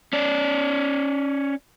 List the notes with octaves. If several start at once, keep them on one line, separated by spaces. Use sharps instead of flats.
C#4 D5